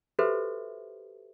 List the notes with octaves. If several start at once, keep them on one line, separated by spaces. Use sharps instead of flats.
F#4 G4 A4 B4 C5 E5